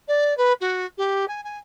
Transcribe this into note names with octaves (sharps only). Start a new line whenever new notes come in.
D5
B4
F#4
G4
G#5
G#5